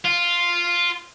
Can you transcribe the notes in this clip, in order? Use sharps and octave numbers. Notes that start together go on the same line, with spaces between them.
F4